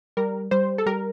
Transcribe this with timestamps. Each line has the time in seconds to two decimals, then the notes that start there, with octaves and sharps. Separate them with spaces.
0.17 G3 A#4
0.51 G3 C5
0.78 A4
0.86 G3 A#4